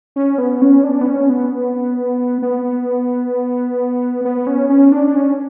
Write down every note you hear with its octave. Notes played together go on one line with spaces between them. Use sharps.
C#4
B3
C#4
D4
B3
C#4
B3
B3
B3
C#4
C#4
D4
D4
C#4